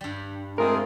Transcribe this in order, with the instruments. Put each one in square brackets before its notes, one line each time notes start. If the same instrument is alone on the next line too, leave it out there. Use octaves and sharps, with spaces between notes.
[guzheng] G2 G3
[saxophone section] G#3 C4 [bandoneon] A3 F4 G#4 [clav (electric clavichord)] A#4